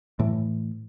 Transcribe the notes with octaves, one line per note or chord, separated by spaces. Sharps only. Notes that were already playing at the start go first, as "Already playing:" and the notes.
A2 E3